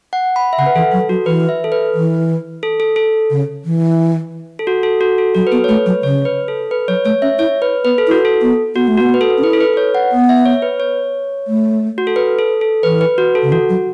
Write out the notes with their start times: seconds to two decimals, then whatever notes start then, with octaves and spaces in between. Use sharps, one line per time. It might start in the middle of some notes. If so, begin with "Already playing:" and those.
0.13 F#5
0.36 B5
0.53 E5
0.58 C#3 F#5
0.66 B4
0.75 E3 A4
0.92 F#3 A4
1.09 F#3 F#4
1.26 E3 B4
1.49 E5
1.64 A4
1.72 B4
1.94 E3
2.63 A4
2.80 A4
2.96 A4
3.31 C#3
3.65 E3
4.59 A4
4.67 F#4
4.83 A4
5.01 F#4
5.18 A4
5.35 F#3 F#4
5.47 B4
5.52 B3 A4
5.64 C#5
5.68 A3 B4
5.86 F#3 C#5
6.03 C#3 C#5
6.25 B4
6.48 A4
6.71 B4
6.88 F#3 C#5
7.05 A3 C#5
7.22 C#4 E5
7.39 E4 C#5
7.62 B4
7.85 B3 B4
7.98 A4
8.07 E4 F#4
8.25 A4
8.42 B3
8.75 B3 F#4
8.88 A3
8.97 B3 F#4
9.14 B4
9.21 A4
9.38 C#4
9.43 E4 B4
9.53 A4
9.61 B4
9.73 B4
9.77 C#5
9.95 F#5
10.12 B3
10.29 E5
10.45 C#5
10.62 B4
10.80 C#5
11.47 A3
11.98 F#4
12.07 A4
12.16 B4
12.39 A4
12.61 A4
12.83 E3 B4
13.01 B4
13.18 F#4
13.35 A4
13.43 C#3
13.52 E3 F#4
13.69 F#3